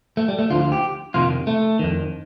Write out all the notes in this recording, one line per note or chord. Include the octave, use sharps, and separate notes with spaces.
A3
G3
A3
D2 D3 F3 F4
F4
G4
F2 C3 D#3 F4
A3
F2 D#3